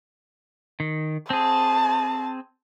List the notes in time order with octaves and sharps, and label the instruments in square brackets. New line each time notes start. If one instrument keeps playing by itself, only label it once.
[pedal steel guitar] D#3
[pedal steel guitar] C4 G#4 [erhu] A5